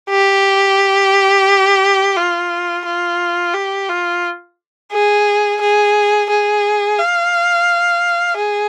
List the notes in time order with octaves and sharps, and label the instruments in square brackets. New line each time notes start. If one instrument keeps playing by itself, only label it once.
[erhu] G4
F4
F4
G4
F4
G#4
G#4
G#4
F5
G#4